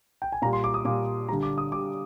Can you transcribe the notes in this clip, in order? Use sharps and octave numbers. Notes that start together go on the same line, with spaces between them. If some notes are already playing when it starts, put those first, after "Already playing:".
G5
G#5
A#2 G3 A#5
C6
D6
D#6
A#2 G3 D6
D3 G3 A#5
D6
D#6
D3 G3 D6